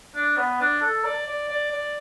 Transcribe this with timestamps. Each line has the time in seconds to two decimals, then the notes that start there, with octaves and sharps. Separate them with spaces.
0.15 D4
0.37 B3
0.60 D4
0.82 A4
1.04 D5
1.26 D5
1.49 D5
1.71 D5